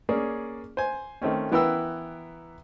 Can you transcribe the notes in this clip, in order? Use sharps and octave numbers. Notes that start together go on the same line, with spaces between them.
A#3 C#4 G#4 D5
C5 G#5
D#3 A3 C4 C#4
E3 B3 E4 A#4 G5 E6